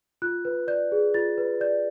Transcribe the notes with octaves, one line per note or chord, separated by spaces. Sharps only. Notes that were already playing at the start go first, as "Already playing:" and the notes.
F4 F#6
B4
D5 G6
G#4
F4 A6
B4
D5 G6